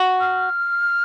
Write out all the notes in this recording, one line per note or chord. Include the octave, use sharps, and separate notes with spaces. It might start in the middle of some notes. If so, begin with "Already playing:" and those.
Already playing: F#4
F6